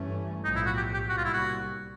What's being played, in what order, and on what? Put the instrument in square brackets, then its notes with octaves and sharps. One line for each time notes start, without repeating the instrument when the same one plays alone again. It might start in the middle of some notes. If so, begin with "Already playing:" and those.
Already playing: [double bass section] G2 E3 A3 C#4
[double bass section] B1 A2 F3 [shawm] D#4
[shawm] E4
F#4
G4
G4
[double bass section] C2 A#2 G3 [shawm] F#4
[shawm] F4
E4
F#4